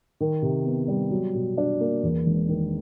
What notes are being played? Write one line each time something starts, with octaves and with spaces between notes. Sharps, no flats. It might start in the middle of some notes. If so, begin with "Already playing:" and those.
D#3
C3
B3
G3
F#3
B2
D4
A#3
E2
E1
D#3